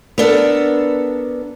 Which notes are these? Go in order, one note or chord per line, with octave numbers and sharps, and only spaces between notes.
B3 D4 A4 A#4